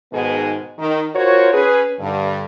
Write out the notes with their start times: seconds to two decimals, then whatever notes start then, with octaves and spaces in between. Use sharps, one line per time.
0.12 G#2 B2 D#3 G#3 B3 G#4
0.79 D#3
1.15 F4 F#4 A#4 C5 C#5
1.53 C#4 G#4 B4
2.00 G2 D3